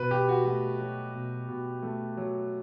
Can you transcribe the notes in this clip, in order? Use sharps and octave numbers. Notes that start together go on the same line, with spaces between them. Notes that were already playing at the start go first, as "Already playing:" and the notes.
Already playing: B2 B4
B2 G4
F#4
A3 F#4
F#3
B2
B2
A3
F#3